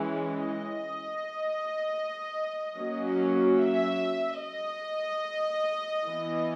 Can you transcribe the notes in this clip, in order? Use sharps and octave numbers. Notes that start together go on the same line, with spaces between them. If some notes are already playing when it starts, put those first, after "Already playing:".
Already playing: E3 G#3 C#4
D#5
F#3 A#3 C#4
E5
D#5
E3 B3